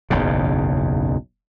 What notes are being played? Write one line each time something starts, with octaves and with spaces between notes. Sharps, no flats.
F#1 B1 E2 C#3